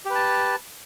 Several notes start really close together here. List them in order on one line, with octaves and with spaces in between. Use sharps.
G4 B4 A5